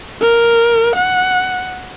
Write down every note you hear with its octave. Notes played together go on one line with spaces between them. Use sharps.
A#4
F#5